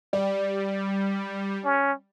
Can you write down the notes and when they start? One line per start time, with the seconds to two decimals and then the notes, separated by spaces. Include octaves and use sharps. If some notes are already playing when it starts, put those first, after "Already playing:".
0.13 G3 D5
1.65 C#4